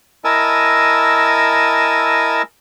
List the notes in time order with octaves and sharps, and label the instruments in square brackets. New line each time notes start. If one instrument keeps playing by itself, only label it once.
[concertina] E4 A#4 D#5 G#5 A5 E6